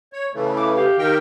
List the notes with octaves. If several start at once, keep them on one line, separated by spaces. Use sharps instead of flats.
C#5
C#3 E3 A3
E4 D6
G4 F5
D#3 G4 A#4 G5